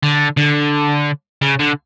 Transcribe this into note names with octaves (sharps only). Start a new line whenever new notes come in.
D3
D3
C#3
D3